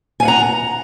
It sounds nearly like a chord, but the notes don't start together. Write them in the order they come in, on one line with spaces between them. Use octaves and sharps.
G#5 F5 F#5 A#5